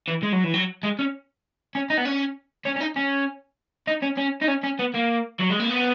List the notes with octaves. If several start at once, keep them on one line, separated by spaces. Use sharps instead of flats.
E3
G#3
F#3
E3
F#3
G#3
C#4
C#4
D#4
B3
C#4
C#4
C#4
D#4
C#4
D#4
C#4
C#4
D#4
C#4
C#4
B3
A#3
F#3
G#3
A#3
B3